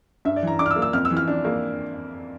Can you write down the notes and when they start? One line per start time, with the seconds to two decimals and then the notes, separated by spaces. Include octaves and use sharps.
0.25 G2 E5
0.36 D5
0.43 E3 A#5
0.59 D4 D6
0.66 F6
0.71 E6
0.76 A#3
0.82 E6
0.93 F2 F6
1.05 E6
1.11 E3
1.17 F6
1.28 D4
1.45 A#3